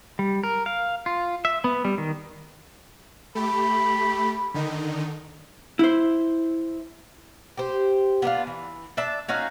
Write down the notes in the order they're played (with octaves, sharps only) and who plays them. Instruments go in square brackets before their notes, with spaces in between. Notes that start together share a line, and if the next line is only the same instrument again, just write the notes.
[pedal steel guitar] G3
A#4
F5
F4
E5
B3
G3
D#3
[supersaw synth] A3 G4 [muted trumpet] B5
[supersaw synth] D3 D#3 D#4
[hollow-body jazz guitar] E4 C5
[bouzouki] G4 C5
B3 D4 D#4 F4
E3
D4 E5 A5
C#4 D#4 F#4 F5